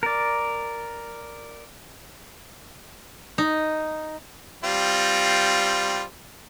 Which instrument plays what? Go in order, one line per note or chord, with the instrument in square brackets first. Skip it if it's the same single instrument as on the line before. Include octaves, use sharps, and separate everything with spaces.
[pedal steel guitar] A#4 D5
[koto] D#4
[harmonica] G3 C4 F4